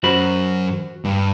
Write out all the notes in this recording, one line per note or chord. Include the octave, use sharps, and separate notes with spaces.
F#2 F#3 F#4 C5 B5
G2